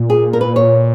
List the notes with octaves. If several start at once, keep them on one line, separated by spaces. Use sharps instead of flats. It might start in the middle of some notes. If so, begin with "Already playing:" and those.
Already playing: A#2
G#4
A#4
B4
C#5